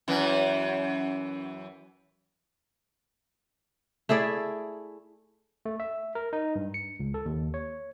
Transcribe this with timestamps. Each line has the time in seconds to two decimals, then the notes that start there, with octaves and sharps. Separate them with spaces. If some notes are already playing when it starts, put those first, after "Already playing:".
0.08 F#2 E3
4.09 A3 E4 G#4 D5
5.66 A3
5.80 E5
6.15 A#4
6.33 D#4
6.56 G2
6.74 C#7
7.00 C#2
7.14 A4
7.26 D#2
7.54 C#5